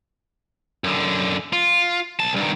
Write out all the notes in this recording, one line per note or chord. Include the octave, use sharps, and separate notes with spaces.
F#2 D3
F4
B1 A5
G2 D#3